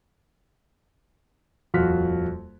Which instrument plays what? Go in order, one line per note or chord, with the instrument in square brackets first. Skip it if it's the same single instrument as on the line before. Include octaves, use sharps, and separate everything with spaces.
[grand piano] D#1 F2 F4 F#4 F6 B6